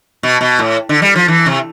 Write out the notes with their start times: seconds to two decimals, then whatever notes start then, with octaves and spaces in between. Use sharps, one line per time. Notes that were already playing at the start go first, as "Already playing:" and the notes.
0.23 B2
0.41 B2
0.59 A2
0.89 D3
1.02 G3
1.16 F3
1.28 E3
1.46 C3